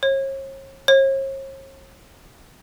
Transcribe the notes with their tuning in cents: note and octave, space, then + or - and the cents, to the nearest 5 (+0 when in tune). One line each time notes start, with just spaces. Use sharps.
C#5 -40
C#5 -45